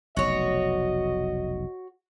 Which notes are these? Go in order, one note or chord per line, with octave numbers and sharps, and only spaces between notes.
F1 B1 F#4 C#5 D#5